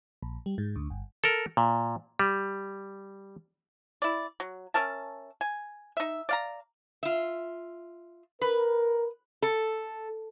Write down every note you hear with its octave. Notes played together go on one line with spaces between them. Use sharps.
A#1
G3
G#2
D2
G1
A4 A#4
A#2
G3
E4 D5
F#3
C#4 A#4 E5 A5
G#5
D#4 E5
D5 F5 A#5
F4 E5
A#4 B4
A4